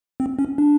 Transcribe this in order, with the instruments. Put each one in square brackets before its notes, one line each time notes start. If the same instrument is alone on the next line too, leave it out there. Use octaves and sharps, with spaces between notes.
[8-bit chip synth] C4
C#4
D4